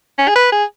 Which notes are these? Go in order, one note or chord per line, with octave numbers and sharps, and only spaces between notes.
C#4
G#4
B4
G#4